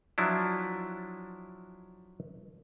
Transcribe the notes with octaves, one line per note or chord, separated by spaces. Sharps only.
F3 F#3 D4 E4